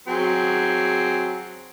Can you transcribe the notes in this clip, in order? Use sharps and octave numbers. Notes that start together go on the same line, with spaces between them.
F#3 C4 G#4